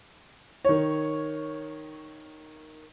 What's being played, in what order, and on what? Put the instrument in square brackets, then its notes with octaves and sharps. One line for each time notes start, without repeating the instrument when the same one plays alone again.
[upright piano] D#3 C#5